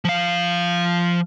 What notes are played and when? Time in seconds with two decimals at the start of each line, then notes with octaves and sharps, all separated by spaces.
0.05 F3 F5